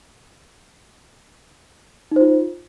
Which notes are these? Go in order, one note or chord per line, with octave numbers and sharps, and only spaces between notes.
D#4 F4 C5